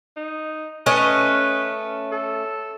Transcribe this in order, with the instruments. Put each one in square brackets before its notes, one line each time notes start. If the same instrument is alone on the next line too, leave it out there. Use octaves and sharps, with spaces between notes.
[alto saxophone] D#4
[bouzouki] A3 C#4 D#5 [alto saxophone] B4
[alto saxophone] A4